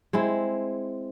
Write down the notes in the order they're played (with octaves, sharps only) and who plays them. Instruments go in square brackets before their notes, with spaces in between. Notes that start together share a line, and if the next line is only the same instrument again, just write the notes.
[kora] G#3 C4 E4